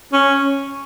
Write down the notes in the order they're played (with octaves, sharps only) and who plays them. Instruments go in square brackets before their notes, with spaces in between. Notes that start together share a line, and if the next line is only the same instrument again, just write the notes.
[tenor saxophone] C#4